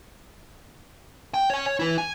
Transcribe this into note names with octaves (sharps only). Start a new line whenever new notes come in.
G5
C#5 G#5
C#5
E4 B4
G#5